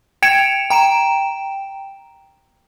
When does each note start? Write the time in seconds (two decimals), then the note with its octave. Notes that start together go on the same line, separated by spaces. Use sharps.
0.22 G5 G#6 C#7 D7 E7 F7
0.70 G5 A#5 D7 E7